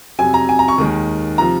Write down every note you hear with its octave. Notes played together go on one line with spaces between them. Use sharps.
F2 C3 F#3 G#5
A#5
G#5
A#5
C#6
D#2 D#3 G#3
C3 F3 A#5